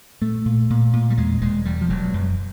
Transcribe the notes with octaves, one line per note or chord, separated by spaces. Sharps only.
A#2 A3
A#2
A#2
A#2
G3
E2 G#3
E1 G#3
E1 G3
F3
E1 F#3
F#2